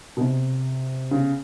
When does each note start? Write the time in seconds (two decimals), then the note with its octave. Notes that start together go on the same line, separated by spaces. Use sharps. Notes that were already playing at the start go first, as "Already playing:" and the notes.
0.17 B2
0.21 C3
1.11 C#3